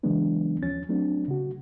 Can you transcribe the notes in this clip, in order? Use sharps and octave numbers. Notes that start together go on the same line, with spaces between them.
C#3 E3 F#3 G#3 B3 D4
D#2 F3 C#4 A6
F#3 A3 C4 D4
C#3 F#4